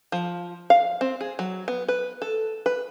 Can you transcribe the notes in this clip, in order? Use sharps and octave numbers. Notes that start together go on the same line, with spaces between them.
F3
F5
C4
G#4
F#3
B3
B4
A4
B4